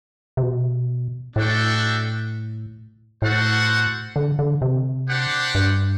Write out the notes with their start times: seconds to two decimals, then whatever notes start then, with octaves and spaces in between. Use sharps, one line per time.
0.37 C3
0.43 B2
1.36 A2 D4 F#4 A4 E5 G5
3.22 A2 F#4 A4 C5 F#5
4.16 D3
4.39 D3
4.62 C3
5.08 D4 G4 C5 F#5
5.55 G2